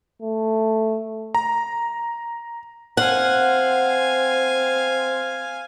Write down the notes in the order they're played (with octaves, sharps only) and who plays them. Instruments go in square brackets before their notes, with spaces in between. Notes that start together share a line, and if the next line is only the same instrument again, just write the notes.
[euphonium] A3
[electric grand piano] A#5
[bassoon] C4 [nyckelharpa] F5 G#5 [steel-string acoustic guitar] F#5